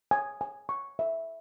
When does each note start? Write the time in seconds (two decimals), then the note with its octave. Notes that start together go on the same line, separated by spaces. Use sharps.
0.11 G#5
0.41 G#5
0.69 C#6
0.99 E5